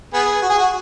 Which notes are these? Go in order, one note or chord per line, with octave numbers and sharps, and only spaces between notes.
B3 G#4
F#4
G#4
F#4